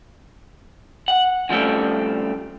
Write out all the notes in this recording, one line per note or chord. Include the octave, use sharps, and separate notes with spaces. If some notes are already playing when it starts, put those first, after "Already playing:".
F#5
C#3 F3 G3 A3 C4